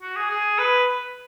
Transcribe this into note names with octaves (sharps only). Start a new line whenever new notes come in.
F#4
G#4
G#4
B4